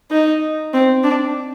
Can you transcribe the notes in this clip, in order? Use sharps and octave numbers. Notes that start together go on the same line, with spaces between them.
D#4
C4
D4